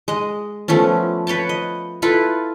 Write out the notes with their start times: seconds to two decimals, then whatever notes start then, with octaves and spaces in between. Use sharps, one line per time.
0.08 G#3 D#5
0.68 F3 A3 B3 C#4
1.27 B4 C#5 G5 A5
1.49 D#5
2.02 E4 F4 A4 B4